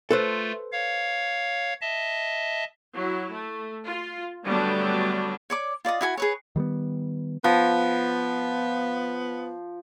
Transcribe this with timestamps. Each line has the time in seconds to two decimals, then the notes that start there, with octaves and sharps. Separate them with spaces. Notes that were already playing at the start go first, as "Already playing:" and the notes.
0.11 A3 F4 A4 B4 C5
0.72 C#5 F5
1.81 D#5 E5 A5
2.94 F#3 E4
3.32 A3
3.86 F4
4.44 D3 F#3 G3 A3 B3 D4
5.50 C#5 D5 D6
5.85 F4 D5 D#5 D#6
6.01 E4 F#4 G#5
6.17 G#4 B4 C#5
6.56 D#3 G3 A#3 B3
7.44 F3 B3